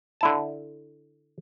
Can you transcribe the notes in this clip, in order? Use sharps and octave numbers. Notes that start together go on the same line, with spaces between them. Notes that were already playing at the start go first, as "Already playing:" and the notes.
D3 E4 A5